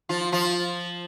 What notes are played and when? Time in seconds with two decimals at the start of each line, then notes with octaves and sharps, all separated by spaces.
0.09 F3 F4
0.32 F3 F4